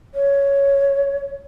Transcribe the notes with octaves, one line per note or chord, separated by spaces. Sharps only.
C#5